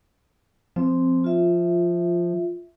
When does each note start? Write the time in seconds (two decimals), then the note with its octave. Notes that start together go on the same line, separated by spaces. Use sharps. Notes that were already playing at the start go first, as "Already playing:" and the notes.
0.76 F3 C4
1.24 F4 E5